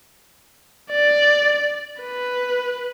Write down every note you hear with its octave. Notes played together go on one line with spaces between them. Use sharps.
D5
B4